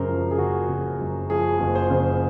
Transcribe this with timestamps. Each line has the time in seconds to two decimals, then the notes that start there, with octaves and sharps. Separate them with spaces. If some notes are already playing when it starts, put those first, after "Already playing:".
Already playing: F#2 C#3 A#4 C5
0.08 F3
0.31 G#4
0.38 F#1 F#4
0.68 C#3
1.00 F#2
1.30 F3 G#4
1.60 F#1
1.75 C5
1.90 C#3